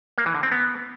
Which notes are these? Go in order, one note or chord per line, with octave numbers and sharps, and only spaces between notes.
A#3
E3
D3
C4
B3